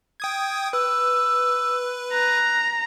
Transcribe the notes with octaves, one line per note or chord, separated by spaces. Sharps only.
G5 D#6 G#6
B4 E6
A#5 F#6